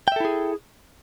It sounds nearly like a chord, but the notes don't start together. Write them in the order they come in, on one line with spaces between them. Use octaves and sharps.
G5 E5 A4 E4 G#4